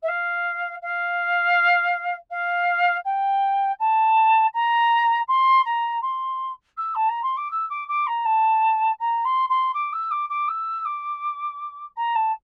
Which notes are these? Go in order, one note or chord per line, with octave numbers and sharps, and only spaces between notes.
E5
F5
F5
F5
G5
A5
A#5
C6
A#5
C6
E6
A5
A#5
C6
D6
E6
D6
D6
A#5
A5
A#5
C6
C6
D6
E6
D6
D6
E6
D6
A#5
A5